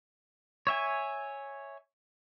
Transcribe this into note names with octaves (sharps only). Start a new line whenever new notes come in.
C#5 E5 G#5